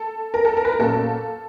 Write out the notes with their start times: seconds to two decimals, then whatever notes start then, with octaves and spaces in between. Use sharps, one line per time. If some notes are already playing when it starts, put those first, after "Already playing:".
Already playing: A4
0.34 A#4
0.45 A4
0.57 A#4
0.65 B4
0.72 A#4
0.79 A#2 F#3 A#3 C#4 A4